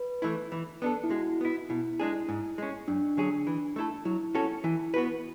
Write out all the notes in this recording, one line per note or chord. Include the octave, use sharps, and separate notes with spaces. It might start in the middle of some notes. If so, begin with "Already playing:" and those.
Already playing: B4
E3 A3 E4
E3
B3 D4 A4
E4
G#3 F#4
B3 E4
B2 E4
G#3 D4 G#4
G#2
G#3 C#4
F#2 D4
D3 F#3 C#4 G#4
E3
A3 E4 A4
F#3 E4
C#4 F#4 A4
E3 E4
B3 F#4 B4